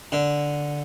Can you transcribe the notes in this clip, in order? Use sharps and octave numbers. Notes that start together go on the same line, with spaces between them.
D3